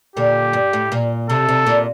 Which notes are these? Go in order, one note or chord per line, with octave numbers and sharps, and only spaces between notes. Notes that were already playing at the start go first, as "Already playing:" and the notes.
A#2 D3 G4
G2
A2
A#2
C3 A4
C3
A#2